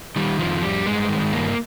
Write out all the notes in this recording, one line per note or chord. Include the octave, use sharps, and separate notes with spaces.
D#3 G3
F2 F3
F2 G3
G2 G#3
D#3
G2 A#3